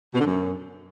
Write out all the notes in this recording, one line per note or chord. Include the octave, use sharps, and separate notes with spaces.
B2
D3
F#2